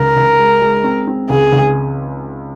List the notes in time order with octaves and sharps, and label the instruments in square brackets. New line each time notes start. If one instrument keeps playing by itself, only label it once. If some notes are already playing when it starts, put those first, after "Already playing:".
Already playing: [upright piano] C#2 [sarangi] A#4
[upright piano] C#2
G#3
G#3
C4
C4
[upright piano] C#2 [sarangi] G#4
[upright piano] C#2